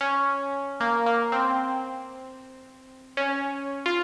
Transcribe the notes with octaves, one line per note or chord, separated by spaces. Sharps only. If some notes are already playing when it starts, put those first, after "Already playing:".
C#4
A#3
A#3
C4
C#4
F4